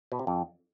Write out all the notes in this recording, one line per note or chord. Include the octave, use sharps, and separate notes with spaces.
B2
C3
F2